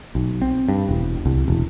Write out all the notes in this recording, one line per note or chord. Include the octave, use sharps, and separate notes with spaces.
B1
C4
G2
E1
C2
E1